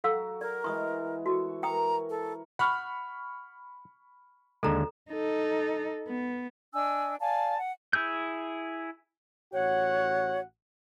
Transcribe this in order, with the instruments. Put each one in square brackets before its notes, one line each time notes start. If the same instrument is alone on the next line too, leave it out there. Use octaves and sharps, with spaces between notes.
[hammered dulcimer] F#3 F#4 [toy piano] A4 F5 E6
[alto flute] A#4 [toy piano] D5
[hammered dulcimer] E3 G#3 [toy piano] C#6 D#6
[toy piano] F#4 [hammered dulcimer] A4 C#5
[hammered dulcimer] A#4 C#5 [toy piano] G5 D#6 [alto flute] A#5
[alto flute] A4
[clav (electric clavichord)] F#5 [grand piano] B5 C#6 F6
[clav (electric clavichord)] D#2 D3 G#3 [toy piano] A4 A#5
[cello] D#4 A4
B3
[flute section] D4 D#5 G#5 E6
D5 F5 G#5 A5
F#5
[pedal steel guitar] E4 G#4 E6 G6
[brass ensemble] A1 F#4 F#5 [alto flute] C#5